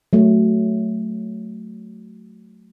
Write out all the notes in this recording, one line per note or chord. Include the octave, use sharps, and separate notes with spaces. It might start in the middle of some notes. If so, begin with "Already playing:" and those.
F#3 A3